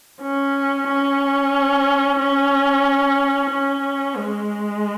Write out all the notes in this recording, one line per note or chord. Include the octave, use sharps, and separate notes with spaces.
C#4
C#4
C#4
C#4
G#3